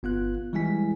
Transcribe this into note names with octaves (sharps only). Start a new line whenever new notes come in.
G1 B3 F4 F#6
E3 G3 G#3 E4 G#5 B6